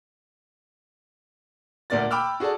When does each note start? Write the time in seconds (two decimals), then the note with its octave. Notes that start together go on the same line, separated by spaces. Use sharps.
1.90 D2 A#2 A#4 D5 A6
2.11 G5 B5 D6 E6 F6
2.40 F#4 G#4 A4 D5 A5